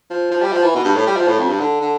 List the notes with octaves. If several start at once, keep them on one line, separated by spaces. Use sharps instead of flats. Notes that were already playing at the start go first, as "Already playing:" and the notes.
F3
F3
G3
F3
E3
B2
G2
A2
G3
F3
A2
F2
G2
D3
D3